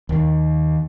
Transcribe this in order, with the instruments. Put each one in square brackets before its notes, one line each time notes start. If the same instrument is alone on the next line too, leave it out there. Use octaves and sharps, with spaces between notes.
[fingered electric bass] D#2 D#3